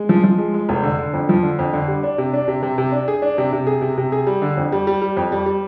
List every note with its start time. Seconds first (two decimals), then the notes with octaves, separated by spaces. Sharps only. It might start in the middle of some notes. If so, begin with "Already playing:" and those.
Already playing: G#3
0.09 F3
0.24 F3
0.38 G#3
0.54 G#3
0.69 F1
0.83 D3
0.99 D3
1.13 F2
1.29 F3
1.43 D3
1.59 F2
1.73 D3
1.88 G3
2.03 D4
2.18 C3
2.34 D4
2.48 C3
2.63 C3
2.78 C3
2.92 D4
3.08 G#4
3.22 D4
3.38 C3
3.53 C3
3.67 G#4
3.82 C3
3.98 C3
4.12 G#4
4.27 G3
4.42 D3
4.57 F2
4.72 G3
4.87 G3
5.02 G3
5.17 F2
5.32 G3
5.46 G3